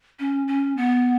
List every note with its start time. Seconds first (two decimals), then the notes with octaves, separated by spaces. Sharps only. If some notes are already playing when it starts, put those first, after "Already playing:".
0.20 C#4
0.48 C#4
0.77 B3